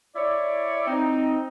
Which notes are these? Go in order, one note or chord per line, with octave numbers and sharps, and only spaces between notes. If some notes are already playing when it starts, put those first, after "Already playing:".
E4 C#5 D5
C4 D#4